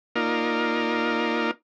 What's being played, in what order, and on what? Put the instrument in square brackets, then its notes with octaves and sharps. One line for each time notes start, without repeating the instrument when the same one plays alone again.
[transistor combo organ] A#3 D#4 F4 A#4 D5